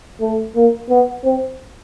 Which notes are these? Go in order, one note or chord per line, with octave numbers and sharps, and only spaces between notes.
A3
A#3
B3
C4